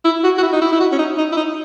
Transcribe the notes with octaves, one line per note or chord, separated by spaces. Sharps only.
E4
F#4
F#4
E4
D#4
E4
E4
F#4
C#4
D#4
D#4
E4
D#4